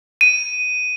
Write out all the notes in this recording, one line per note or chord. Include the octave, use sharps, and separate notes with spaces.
D#7